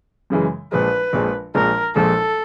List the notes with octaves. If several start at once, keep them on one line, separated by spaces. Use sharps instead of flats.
F#2 C#3 E3 G#3
A#1 A#2 F3 G#3 B4
A#1 A#2 F3 G#3
A#1 A#2 F3 G#3 A#4
A#1 A#2 F3 G#3 A4